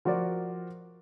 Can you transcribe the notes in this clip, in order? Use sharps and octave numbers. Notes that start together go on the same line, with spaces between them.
F3 F#4 A#4 D5